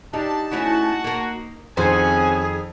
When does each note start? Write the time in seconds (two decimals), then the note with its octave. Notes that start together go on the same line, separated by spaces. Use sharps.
0.13 G3 D4 D#4 A5
0.52 A3 C#4 E4 F#4
1.04 A#3 A#4
1.77 F2 D#3 C4 C#4 F#4 G#4 C5 G#5